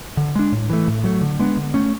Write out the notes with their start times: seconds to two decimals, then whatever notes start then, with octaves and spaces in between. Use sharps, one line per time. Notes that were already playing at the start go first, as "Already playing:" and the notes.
0.17 D3
0.36 G#3 D4
0.52 A2
0.70 E3 A3
0.88 A2
1.04 F#3 A3
1.21 D3
1.40 G#3 B3 D4
1.57 D3
1.74 A3 C#4